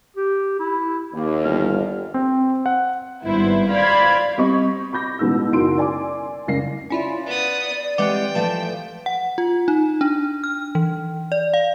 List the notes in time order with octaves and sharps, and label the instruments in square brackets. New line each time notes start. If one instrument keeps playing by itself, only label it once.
[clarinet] G4
E4
[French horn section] D#2 [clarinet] A#3
[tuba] G1 [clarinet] F6
[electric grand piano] C4
F#5
[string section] G#1 G2 B3 E4 C5
C5 D5 F5 B5 G#6
[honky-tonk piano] G3 C4 D#5 C#6
B5 D6 G6 A#6
A1 B2 G#3 D#4 E6
F#1 D#4 F#4 C6 D7
D5 G#5 C6 D6
F#1 C#2 A#6 C7
[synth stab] C#4 E4 F4 [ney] D5
[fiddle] B3 D#6
[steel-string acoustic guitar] E3 G#3 C4 [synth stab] G4 F#5 [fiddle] G5
[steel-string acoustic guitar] E3 F3 A3 [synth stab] A5
[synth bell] F#5
F4
D#4
D4
F6
E3
D5
F5